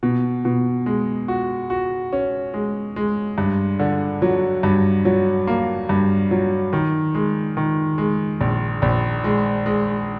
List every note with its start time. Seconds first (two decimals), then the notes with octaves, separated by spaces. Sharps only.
0.03 B2
0.45 B2
0.86 G#3
1.28 F#4
1.70 F#4
2.13 C#4
2.54 G#3
2.96 G#3
3.38 G2
3.79 D3
4.22 F#3
4.63 G2
5.05 F#3
5.47 A#3
5.89 G2
6.31 F#3
6.73 D#3
7.15 G#3
7.57 D#3
7.98 G#3
8.41 A#1
8.82 A#1
9.24 G#3
9.66 G#3